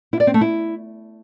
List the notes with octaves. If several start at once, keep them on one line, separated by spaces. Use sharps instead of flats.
E4
D5
C4
A3
E4